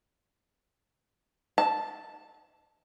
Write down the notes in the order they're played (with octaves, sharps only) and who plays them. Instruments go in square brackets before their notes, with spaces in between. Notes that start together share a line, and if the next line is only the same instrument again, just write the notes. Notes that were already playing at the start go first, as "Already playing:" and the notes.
[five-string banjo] A5